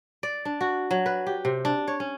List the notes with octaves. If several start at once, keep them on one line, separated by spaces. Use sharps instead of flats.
D5
D4
F#4
F#3
B4
G4
C3
D4
C#5
C#4